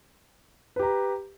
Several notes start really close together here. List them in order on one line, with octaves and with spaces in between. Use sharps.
B4 G4 A#5